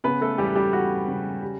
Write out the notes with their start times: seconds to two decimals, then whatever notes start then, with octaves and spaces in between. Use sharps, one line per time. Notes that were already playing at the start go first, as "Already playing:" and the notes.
0.04 C#3 B3 B4
0.21 A3 A4
0.38 E2 G3 G4
0.55 G3 G4
0.73 E2 F#4
1.08 C#3
1.42 G3